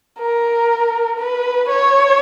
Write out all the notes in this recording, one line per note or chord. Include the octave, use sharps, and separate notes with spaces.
A#4
B4
C#5